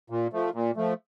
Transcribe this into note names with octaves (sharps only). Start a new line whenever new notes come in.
A#2
F3 A3
A#2
F3 A3